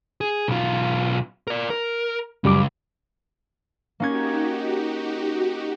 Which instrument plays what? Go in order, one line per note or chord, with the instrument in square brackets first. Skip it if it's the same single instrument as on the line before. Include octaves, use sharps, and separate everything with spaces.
[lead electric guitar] G#4
B1 F4
A#4 D5
A#4
[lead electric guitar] C#2 [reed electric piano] F#2 G3 D6
[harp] A#3 C#4 G#6 [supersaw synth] D#4 F#4 G4